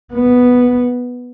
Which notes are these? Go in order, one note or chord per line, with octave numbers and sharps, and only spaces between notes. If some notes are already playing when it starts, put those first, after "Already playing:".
B3